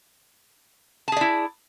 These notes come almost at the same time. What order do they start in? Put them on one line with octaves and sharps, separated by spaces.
A5 G#4 D5 E4